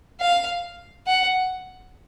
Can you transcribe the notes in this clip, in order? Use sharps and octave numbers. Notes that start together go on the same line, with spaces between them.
F5
F#5